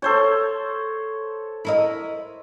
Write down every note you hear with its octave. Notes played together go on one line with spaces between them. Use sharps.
A4 C5 C#5
E4 A#4 D#5